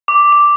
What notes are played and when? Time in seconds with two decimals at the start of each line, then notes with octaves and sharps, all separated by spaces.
0.08 D6
0.33 D6